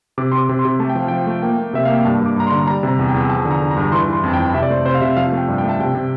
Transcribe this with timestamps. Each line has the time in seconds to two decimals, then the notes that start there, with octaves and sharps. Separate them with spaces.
0.18 C3 D6
0.32 C3 C6
0.38 D6
0.49 C3
0.59 C6
0.65 C3
0.79 A3 A5
0.90 G5
0.95 F3 F5
1.08 F3 G5
1.27 A3
1.42 A#3 G5
1.58 A#3
1.73 C3 E5
1.85 A#3 F5
1.95 G5
2.05 G2 A5
2.21 G2
2.26 D6
2.36 G2 A#5
2.47 C6
2.52 D3
2.67 G3 A#5
2.83 C3
2.88 A#5
2.99 E2
3.09 G5
3.14 E2
3.22 G5
3.29 F3 A5
3.45 D3
3.50 A#5
3.61 D3
3.71 A#5
3.76 G2
3.92 E3 C6
4.08 E3
4.13 C6
4.24 F2 A5
4.33 G5
4.39 E3
4.54 C3 E5
4.62 D5
4.70 A3 C5
4.85 C3 C5
4.94 F5
5.01 C3 E5
5.17 F3 F5
5.32 A3
5.37 G5
5.48 G2
5.58 G5
5.64 A3
5.69 A5
5.80 C3 G5
5.95 C3